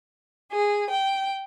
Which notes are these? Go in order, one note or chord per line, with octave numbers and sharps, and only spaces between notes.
G#4
G5